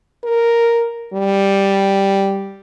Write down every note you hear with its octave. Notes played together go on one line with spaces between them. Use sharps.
A#4
G3